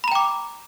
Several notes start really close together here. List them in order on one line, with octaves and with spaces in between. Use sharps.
B5 A#5 G5 D6